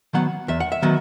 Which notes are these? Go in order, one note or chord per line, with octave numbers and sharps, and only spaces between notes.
D#3 F#3 B3 F#5
E2 E5
F#5
E5
D#3 F#3 B3